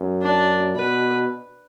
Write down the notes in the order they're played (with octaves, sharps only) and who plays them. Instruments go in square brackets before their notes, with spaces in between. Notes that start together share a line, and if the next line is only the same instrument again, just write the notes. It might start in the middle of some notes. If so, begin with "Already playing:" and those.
Already playing: [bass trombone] F#2
[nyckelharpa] D4
[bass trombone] B2 [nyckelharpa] B4